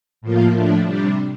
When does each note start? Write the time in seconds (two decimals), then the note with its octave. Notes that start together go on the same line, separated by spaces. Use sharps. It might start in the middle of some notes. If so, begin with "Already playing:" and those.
0.21 A2 F3 A#3 F4
0.53 A2 F3 A3 D4
0.85 C3 G3 D4